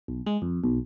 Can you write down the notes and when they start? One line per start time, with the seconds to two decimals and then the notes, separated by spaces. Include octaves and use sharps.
0.08 B1
0.27 G#3
0.42 F2
0.64 B1